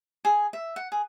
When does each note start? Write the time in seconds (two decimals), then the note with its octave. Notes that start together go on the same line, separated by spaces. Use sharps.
0.25 G#4
0.53 E5
0.76 F#5
0.92 G#4